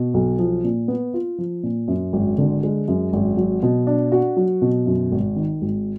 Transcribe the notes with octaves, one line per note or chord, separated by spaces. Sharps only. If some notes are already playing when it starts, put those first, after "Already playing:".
Already playing: B2
B1
F3
A#2
B3
F4
F3
A#2
F#2
G#1
D3
G#3
F#2
G#1
F#3
B2
D4
F#4
F#3
B2
F#2
G#1
D#3
G#1